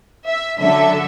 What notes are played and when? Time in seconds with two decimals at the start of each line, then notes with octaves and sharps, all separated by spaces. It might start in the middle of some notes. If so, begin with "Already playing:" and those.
0.28 E5
0.61 D3 F#3 A4 E5